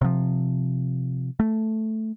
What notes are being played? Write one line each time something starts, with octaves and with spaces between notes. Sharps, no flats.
C3 F3
A3